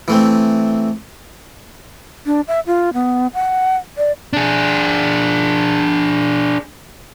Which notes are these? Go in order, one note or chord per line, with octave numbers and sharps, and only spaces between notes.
E3 A3 C4
D4
E5
F4
B3
F#5
D5
D4 G#4